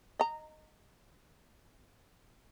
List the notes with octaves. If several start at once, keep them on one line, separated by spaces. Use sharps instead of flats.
D#5 A#5